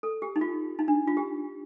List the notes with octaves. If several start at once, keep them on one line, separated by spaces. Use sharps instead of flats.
A4
G4
D#4
F4
D#4
D4
F4
G4